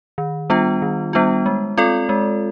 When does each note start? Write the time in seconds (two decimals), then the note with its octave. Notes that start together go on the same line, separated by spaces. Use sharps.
0.18 D#3
0.50 G3 B3 D4 F4
0.82 D#3
1.13 G3 B3 D4 F4
1.46 G#3
1.78 C4 F4 A4 D5
2.09 G#3